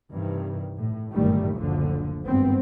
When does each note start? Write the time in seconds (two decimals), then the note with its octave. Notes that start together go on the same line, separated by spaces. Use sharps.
0.12 G2 C3 D#3 E3
0.77 A2
1.12 G1 F#2 A#2 D#3 G3 A3
1.56 F#1 D2 D3 F3
2.26 G#1 G2 B3 C4